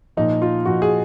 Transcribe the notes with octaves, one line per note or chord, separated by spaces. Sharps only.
A#2 F3 D#4
F4
A#2 F3 F#4
G#4